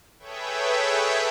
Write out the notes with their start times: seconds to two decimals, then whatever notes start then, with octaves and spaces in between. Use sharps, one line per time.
0.19 G#4 A4 B4 C#5 E5 G5